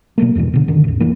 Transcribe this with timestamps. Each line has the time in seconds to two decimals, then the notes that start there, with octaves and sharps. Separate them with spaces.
0.18 B2 F#3 A3 A#3
0.35 E2 G2 B2 E3
0.54 B2 D3
0.68 F#2 D3 D#3
0.84 A1 E2
1.00 F1 E3 A#3